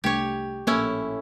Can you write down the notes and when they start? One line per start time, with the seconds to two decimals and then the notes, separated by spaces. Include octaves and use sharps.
0.04 C2 A3 D4 G4 C#5
0.67 A#1 A2 A#3 C#4 E4